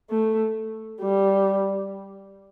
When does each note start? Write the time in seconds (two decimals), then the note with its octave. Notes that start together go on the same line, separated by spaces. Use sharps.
0.10 A3
1.02 G3